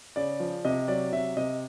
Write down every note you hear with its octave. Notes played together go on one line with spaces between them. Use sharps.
C#3 D5
F3
C3 D#5
F#3 D5
C3 E5
C3 D#5